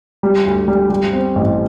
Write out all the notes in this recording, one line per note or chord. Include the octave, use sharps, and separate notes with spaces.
G3
D2
G3
G3
C4
A1